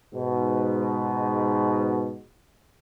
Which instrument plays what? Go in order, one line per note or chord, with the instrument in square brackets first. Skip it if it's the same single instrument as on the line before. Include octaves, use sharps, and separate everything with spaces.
[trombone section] G#2 B2